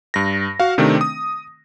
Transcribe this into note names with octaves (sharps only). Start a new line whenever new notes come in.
G2 A#6
F#4 F5
C3 D#3 A3 C4 D4
D#6